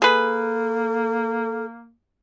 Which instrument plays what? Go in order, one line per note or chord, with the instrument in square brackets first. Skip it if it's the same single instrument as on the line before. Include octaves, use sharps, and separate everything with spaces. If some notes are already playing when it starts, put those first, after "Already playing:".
[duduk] A#3 [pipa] G#4 B4 [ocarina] A4